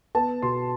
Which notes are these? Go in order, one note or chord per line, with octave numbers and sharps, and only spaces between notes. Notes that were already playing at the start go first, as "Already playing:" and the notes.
B3 A5
B2 C6